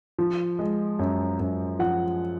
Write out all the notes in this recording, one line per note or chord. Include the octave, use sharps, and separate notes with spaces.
F3
G#3
F#2
F#2
F3 F#5